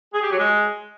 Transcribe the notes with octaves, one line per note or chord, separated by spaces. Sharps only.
G#4
G4
F#3
G#3